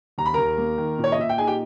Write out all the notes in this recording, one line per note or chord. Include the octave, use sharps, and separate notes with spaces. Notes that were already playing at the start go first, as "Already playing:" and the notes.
D#2 A#5
B5
D#2 A#4 A#5
A#3
D#3
A#2
C#5
D#5
A#2 E5
G5
D#4 G#4 G#5
G4 G5